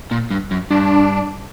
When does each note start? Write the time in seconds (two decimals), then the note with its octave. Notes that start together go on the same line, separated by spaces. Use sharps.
0.11 A#2
0.31 G2
0.51 F#2
0.71 G2 D4